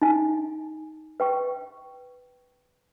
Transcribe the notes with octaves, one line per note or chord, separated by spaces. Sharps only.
D#4 G#5
B4 G5 C#6